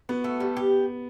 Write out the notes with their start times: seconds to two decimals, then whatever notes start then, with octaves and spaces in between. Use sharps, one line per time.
0.09 B3 F#4
0.24 A3
0.40 G3
0.57 G4